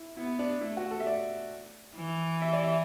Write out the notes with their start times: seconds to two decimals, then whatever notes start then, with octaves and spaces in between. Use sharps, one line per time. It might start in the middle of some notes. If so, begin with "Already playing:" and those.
Already playing: E4
0.16 B3 E4
0.39 D4
0.61 A3 E4
0.77 F#4
0.91 A4
1.00 E5
1.07 D5
1.96 E3
2.42 E5
2.53 D5
2.64 E5